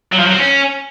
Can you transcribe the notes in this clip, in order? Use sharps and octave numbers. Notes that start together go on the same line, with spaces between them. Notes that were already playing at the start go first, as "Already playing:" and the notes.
F#3
F3
F#3
C4
C#4